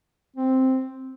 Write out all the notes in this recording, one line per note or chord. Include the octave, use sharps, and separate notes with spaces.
C4